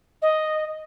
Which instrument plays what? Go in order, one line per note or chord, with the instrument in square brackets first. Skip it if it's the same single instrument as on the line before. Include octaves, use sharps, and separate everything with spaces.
[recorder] D#5